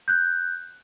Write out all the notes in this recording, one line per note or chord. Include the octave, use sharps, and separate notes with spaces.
F#6 G6